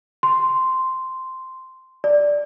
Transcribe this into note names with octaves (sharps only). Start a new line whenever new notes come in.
C6
D5